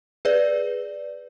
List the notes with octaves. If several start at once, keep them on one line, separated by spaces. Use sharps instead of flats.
G#4 B4 D5